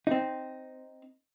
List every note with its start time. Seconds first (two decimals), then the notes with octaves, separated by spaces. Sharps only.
0.07 C4 D#4